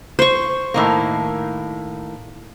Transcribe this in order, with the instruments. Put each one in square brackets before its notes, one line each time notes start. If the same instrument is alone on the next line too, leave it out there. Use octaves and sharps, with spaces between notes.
[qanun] C5 C#6
[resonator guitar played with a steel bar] A2 D#3 A#3